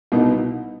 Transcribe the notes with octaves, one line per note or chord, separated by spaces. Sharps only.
C2 B2 B3 D#4